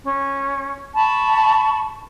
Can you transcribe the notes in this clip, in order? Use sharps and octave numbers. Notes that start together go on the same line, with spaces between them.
C#4
A5 B5 C#6